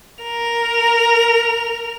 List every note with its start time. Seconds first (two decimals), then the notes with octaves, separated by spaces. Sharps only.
0.23 A#4 F7